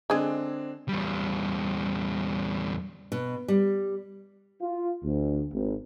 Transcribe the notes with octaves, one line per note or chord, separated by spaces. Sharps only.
D3 G#3 C4 D4 G#4
E2 G3
B2
G3
F4
D2
G#1